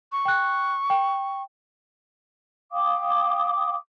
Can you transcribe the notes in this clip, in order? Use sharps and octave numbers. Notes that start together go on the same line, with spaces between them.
C#6
G5 F#6
G5
F5 G5 D6 D#6